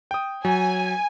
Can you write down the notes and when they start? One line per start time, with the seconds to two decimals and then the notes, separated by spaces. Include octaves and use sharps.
0.11 G5 D#6
0.45 F#3 G#5